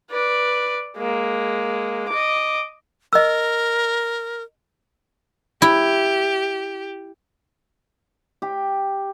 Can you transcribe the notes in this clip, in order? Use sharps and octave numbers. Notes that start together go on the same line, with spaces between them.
B4 D5
G#3 A#3
D#5 D6
A#4 D#5 E6
E4 G4
G4